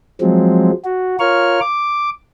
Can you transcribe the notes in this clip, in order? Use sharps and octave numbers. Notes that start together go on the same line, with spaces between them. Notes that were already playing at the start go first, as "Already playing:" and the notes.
F3 F#3 G#3 C4
F#4
F4 A#4 C#5 C#6 F6
D6